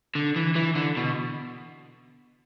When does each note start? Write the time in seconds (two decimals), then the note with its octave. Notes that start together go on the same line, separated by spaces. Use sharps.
0.15 D3
0.36 E3
0.55 E3
0.75 D3
0.97 B2